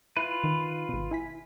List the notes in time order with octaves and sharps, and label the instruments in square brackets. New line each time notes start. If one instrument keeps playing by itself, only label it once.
[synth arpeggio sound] E4 [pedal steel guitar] F4 B4
[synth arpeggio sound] D#3
G#1 B2
E4 G#5 B6